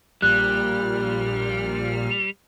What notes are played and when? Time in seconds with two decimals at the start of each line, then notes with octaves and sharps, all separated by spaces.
0.22 A#1 A#2 G3 F6 F#6